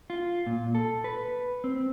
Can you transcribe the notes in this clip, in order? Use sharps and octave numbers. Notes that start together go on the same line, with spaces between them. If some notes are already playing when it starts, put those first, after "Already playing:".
F4
A#2
A4
B4
C4